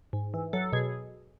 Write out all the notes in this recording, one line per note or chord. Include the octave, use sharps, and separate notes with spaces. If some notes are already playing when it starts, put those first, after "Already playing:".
G#2
E3
F#3 A4
B2 G#4